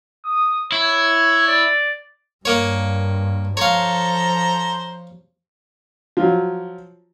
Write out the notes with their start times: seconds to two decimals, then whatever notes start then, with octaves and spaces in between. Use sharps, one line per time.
0.25 D#6
0.72 E4 C#5
1.48 D5
2.45 G2 A#3 C#5
3.57 F3 A4 C5 C#5 F5 A#5
6.17 F3 F#3